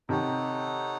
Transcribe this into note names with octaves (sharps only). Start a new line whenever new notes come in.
C3 D#3 D#4 A4 C#5 F#5